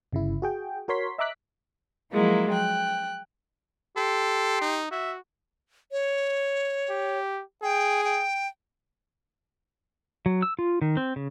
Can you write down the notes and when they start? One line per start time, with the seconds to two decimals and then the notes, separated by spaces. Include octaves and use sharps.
0.13 G1 C#3 E4
0.42 F#4 G#4 G5
0.88 F#4 A#4 C#5 C6 B6
1.18 D#5 E5 A#5 D6 F#6 B6
2.12 F3 F#3 G#3 A#3 E4
2.51 G5 F#6
3.97 G4 A4 C6
4.61 D#4
4.91 F#4 E5
5.92 C#5
6.90 G4
7.63 G#4 G5
8.04 G5
10.26 F#3
10.42 E6
10.59 F4
10.82 D#3
10.97 C4
11.16 C#3